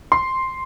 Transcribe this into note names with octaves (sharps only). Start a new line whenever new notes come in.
C6